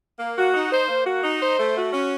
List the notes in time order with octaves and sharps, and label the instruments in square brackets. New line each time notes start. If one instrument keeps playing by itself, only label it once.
[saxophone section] A#3
F#4
D#4
C5
A#3
F#4
D#4
C5
A3
F#4
C#4